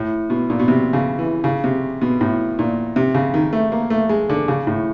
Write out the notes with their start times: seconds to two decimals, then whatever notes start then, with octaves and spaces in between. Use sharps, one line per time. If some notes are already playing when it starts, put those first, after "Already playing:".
Already playing: A2
0.30 B2
0.50 A#2
0.59 B2
0.68 C3
0.93 C#3
1.19 E3
1.44 C#3
1.64 C3
2.01 B2
2.21 A2
2.59 A#2
2.96 C3
3.14 C#3
3.34 D#3
3.53 A3
3.72 A#3
3.90 A3
4.09 G#3
4.30 D3
4.48 C#3
4.67 A2